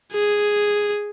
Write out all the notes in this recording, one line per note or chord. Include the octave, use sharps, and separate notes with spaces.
G#4